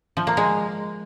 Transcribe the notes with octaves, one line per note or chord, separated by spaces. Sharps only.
F3
A#3
G#3